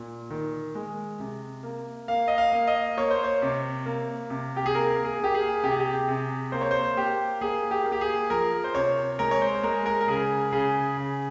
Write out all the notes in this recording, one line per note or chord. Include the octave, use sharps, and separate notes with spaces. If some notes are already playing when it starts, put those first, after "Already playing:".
Already playing: A#2
D#3
G#3
C3
A#3
A#3 F5
D#5
F5
A#3
D#5
A#3 C#5
C5
C#5
C3
A#3
C3
G4
G#4
A#3 A#4
G#4
A#3 G4
G#4
C3 G4
G#4
G4
C3 G#4
A#3 C5
C#5
C5
A#3 G4
A#3 G#4
G4
A#3
G4
G#4
F3 A#4
C5
C3 C#5
G#3 A#4
C#5
C5
G#3 A#4
A#4
A#4
C#3 G#4
C#3 G#4
C#3